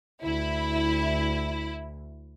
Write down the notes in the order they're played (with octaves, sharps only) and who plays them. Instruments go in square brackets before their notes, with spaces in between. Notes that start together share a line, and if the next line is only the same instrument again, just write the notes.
[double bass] D2 [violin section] E4